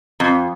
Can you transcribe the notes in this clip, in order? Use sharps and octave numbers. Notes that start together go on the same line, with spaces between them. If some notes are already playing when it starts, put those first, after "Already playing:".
F2